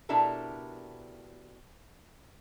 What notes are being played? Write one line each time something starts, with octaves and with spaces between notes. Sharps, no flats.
B2 D4 E4 G4 A4 A#4